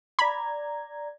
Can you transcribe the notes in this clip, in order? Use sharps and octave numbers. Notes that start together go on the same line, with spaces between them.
D5 A#5 B5 G#6